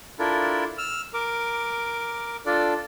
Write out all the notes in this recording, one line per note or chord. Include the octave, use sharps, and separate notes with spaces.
D4 E4 F4 A4 A#4
E6 F6
A#4 D6
D4 F4 A4 D5